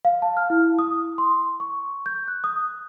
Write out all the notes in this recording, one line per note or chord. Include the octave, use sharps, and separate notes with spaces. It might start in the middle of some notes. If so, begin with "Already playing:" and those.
F5
A5
F6
E4
D#6
C6
C#6
G6
F#6
D#6